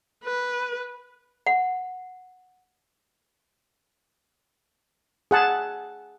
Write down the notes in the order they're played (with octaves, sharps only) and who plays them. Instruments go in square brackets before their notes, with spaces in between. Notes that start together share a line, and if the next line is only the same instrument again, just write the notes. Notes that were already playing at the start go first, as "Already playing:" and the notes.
[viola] B4
[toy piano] F#5
[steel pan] G#4 F#5 A5